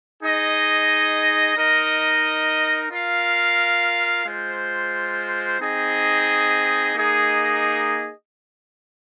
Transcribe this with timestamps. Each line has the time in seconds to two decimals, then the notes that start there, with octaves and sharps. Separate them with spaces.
0.21 D#4 G#4 D#5
1.55 D#4 A#4 D#5
2.89 F4 A#4 F5
4.25 G#3 F4 C5
5.59 C4 D#4 G#4 D#5
6.93 A#3 D#4 G#4 D#5